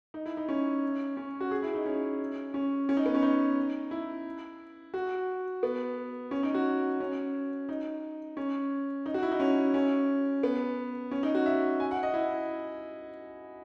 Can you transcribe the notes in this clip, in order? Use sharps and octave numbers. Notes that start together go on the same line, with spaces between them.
D#4
E4
D#4
C#4
C#4
F#4
G#4
E4
D#4
C#4
C#4
C#4
D#4
B3
C#4
D#4
E4
F#4
B3
C#4
D#4
F#4
C#4
D#4
C#4
D#4
F#4
E4
D#4
C#4
C#4
B3
C#4
D#4
F#4
E5
G#5
F#5
D#5
E4